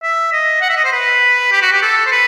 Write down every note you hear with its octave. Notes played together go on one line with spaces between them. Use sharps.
E5
D#5
F#5
E5
D#5
C5
B4
G4
F#4
G4
A4
C5
B4